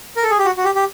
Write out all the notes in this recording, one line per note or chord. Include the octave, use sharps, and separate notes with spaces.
A#4
A4
G#4
G4
F#4
F#4
G4
G4